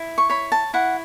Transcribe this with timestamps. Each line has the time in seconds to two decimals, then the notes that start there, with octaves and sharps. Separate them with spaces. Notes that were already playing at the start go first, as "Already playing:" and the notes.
Already playing: E4
0.18 C#6
0.30 C#5 B5
0.52 A5
0.74 E4 F#5